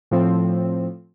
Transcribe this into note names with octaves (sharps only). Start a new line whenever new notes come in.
A2 F3 C4